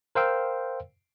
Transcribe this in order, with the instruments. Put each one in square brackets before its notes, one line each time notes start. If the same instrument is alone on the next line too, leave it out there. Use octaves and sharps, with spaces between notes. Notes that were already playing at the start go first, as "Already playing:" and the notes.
[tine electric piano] A#4 C5 F5 G5 E6